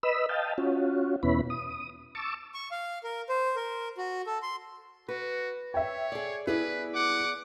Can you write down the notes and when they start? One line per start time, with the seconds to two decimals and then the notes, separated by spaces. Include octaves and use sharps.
0.03 B4 D#5 B5 E6
0.29 D#5 F5 G5 A5
0.58 C#4 F4 F#4
1.23 E2 B2 B3 C#4 E4 B5
1.50 D#6
2.15 A5 C#6 D6 E6
2.54 C#6
2.71 F5
3.04 A#4
3.29 C5
3.56 A#4
3.98 F#4
4.26 A4
4.42 C6
5.08 F#4 B4
5.74 C#5 E5 G5
6.12 G#4 D5
6.47 B3 E4 G#4 B4 D5
6.95 F#5 D6